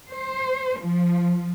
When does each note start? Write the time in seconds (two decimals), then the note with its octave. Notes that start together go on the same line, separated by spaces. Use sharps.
0.10 C5
0.81 F3